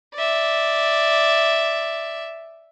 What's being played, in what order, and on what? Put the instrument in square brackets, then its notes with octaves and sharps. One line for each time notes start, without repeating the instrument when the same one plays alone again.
[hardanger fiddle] D5 E5